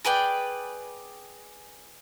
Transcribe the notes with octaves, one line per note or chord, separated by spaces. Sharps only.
G#4 B4 D5 G5